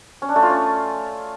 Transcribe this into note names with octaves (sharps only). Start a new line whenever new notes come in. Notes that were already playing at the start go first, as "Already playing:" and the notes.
C#4
D4
A3
F4
C#4